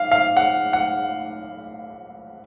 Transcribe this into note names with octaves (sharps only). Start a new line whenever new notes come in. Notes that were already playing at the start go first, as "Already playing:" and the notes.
Already playing: F5
F5
F#5
F#5